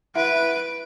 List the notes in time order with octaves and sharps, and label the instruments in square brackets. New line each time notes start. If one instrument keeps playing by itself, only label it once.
[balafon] E4 E5 F#5 [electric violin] B4 D7